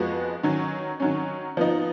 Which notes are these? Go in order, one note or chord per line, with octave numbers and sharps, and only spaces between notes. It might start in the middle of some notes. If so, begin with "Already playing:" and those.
Already playing: F2 F3 G#3 B3 F#4
D#3 F#3 C#4
D#3 F#3 C#4
F3 B3 D#4